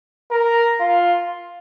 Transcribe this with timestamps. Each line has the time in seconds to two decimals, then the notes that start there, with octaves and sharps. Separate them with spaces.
0.31 A#4
0.80 F4